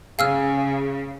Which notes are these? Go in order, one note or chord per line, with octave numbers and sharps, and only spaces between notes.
C#3 G#4 F5 E6 F6